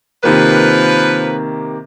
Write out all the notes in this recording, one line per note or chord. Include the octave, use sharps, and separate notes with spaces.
C3 D#3 F3 A#3 A#4 B4